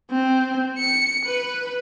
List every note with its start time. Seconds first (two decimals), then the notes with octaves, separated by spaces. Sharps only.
0.11 C4
0.78 C#7
1.26 B4